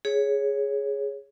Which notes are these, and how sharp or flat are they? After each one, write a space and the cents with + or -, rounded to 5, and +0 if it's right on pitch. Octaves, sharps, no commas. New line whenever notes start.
G#4 +0 C#5 +0